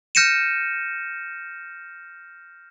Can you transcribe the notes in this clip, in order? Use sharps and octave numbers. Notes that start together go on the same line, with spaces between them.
F6 G6 A#6 C#7 D#7 E7